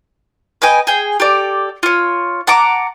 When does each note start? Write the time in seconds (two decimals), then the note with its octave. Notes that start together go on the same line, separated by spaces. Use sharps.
0.62 B4 D#5 G5 G#5
0.87 G#4 G5
1.20 G4 A4 D5
1.83 F4 C#5
2.47 F#5 A5 A#5 D6